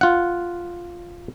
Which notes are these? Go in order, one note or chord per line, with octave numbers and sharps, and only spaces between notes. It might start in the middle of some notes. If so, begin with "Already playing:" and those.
F4 F#5